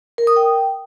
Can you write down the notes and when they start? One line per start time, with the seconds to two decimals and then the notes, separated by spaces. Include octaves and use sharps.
0.18 A#4
0.27 D#6
0.36 G5